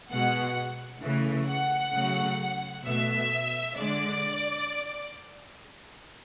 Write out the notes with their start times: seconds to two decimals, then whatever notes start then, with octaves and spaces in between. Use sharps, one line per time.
0.11 B2 G#3 F#5
1.02 C#3 E3 A3
1.47 F#5
1.93 C#3 F#3 A3
2.84 B2 A3 E5
3.75 D3 G#3 D5